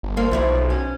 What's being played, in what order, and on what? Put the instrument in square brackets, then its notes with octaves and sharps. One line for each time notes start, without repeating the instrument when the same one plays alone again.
[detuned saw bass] G1
[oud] A#3 C4 D4
[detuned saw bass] B1 [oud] F3 E4 D5
[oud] C#4